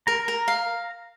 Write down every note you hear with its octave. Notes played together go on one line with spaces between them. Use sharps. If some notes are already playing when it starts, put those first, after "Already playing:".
A#4 A#5
A#4
F5